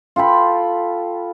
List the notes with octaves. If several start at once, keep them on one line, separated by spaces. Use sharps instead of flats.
F4 A4 G5 B5